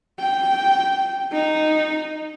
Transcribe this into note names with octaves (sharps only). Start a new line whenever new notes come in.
G5
D#4